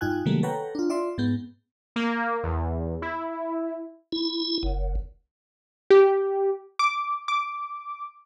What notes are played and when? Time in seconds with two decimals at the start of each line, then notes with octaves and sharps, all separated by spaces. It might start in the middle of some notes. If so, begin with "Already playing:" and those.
0.01 G2 D#4 F4 G5 G#5 F#6
0.26 C3 D#3 F#3 G3 A3 A#3
0.43 A4 B4 C#5 F#5 G5 A#5
0.75 D4 F4
0.90 F4 D5 E5 C6
1.18 G#2 G#3 B3 G6
1.96 A#3
2.44 E2
3.02 E4
4.12 E4
4.63 F#1
5.90 G4
6.79 D6
7.28 D6